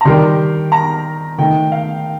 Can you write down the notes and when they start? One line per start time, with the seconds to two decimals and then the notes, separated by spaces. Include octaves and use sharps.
0.01 A#5
0.05 D#3 G3 D4 G4 A#4 C6
0.72 A#5
1.38 D#3 A3 D#4 G5
1.72 F5